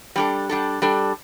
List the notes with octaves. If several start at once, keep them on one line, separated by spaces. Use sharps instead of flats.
G3 D4 A4
G3 D4 A4
G3 D4 A4